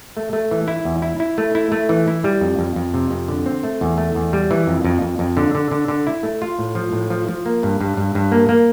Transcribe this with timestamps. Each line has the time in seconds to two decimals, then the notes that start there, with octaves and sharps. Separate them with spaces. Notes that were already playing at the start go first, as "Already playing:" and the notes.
0.17 A3
0.33 A3
0.51 E3
0.68 E4
0.85 E2
1.02 E4
1.20 E4
1.38 A3
1.55 E4
1.72 A3
1.89 E3
2.08 E4
2.24 G3
2.41 F2
2.59 F2
2.76 F2
2.94 C3
3.11 F2
3.28 D3
3.46 C4
3.63 A3
3.81 E2
3.98 A3
4.15 E2
4.33 G3
4.51 E3
4.67 F2
4.85 F2
5.02 F2
5.19 F2
5.37 D3
5.55 D3
5.71 D3
5.88 D3
6.07 E4
6.23 A3
6.42 F4
6.59 A2
6.75 F3
6.93 A2
7.10 F3
7.28 F3
7.46 A#3
7.63 G2
7.81 G2
7.97 G2
8.15 G2
8.32 A#3
8.49 A#3